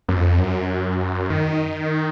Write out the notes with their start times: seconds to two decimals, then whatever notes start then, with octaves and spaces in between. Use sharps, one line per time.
0.09 F#2
0.16 F2
0.39 F#2
1.30 D#3